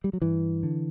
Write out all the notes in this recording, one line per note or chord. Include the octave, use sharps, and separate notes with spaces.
G3
F#3
G2 E3
D3